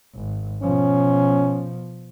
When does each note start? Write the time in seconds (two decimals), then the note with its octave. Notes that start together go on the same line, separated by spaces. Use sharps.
0.15 G#1
0.63 B2 F3 C#4